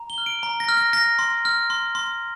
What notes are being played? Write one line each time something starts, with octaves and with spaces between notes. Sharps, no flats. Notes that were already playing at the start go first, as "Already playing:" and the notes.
Already playing: A#5
G7
F6
D7
A#5
A#6
F6
A#6
F6 A#6
C6
F6
C6
C6